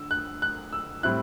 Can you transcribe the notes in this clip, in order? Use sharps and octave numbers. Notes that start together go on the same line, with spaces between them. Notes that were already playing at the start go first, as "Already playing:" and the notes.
Already playing: D3 E6
F#6
F#6
E6
A2 G3 C4 E4 F#6